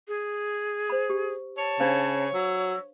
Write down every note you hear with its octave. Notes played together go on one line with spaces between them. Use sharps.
G#4
C5 B5
G4
C#5 A5
C#3 D4 C5 F5
F#3 E6